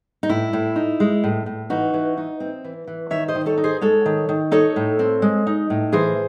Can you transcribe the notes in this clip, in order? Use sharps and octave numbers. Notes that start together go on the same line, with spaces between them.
D#4
A2 E4
A2
D#4
G#3
A2
A2
E3 D#4 F#4
E3
D#4
C4
E3
E3
D#3 C#5 E5
C5 D#5
D#3
A4 C#5
D#4
G#4 C5
G#3 A4 C#5
D#3
D#3
D#4 A4 C#5
A2
C4
G#3
D#4
A2
E3 G#4 C5